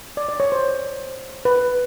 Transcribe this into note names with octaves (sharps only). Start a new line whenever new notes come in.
D5
D5
C#5
C5
B4